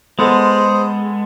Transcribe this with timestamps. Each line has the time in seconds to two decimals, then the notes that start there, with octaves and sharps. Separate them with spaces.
0.19 G#3 B3 A4 C5 D#6